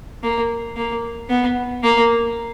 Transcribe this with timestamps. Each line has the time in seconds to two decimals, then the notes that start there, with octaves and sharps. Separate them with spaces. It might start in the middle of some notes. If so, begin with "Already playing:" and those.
0.23 A#3
0.77 A#3
1.29 B3
1.83 A#3